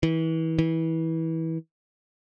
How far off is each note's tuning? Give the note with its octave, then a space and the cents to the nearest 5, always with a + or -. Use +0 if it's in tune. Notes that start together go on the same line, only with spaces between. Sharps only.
E3 -30
E3 -25